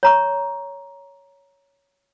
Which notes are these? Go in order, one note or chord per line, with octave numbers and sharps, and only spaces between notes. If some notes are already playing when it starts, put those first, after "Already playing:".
C#5 A#5 C#6